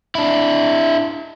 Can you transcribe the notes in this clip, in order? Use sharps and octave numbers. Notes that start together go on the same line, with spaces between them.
D4 E4